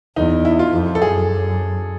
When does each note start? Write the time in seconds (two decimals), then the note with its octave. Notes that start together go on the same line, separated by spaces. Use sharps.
0.16 E2 D#4
0.45 E4
0.59 F4
0.73 F2
0.95 A4
1.01 F#2 G#4